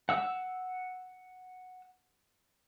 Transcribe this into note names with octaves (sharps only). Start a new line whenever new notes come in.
F#5 E6